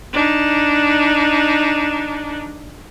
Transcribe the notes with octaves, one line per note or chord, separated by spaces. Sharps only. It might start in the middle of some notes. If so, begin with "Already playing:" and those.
D4 D#4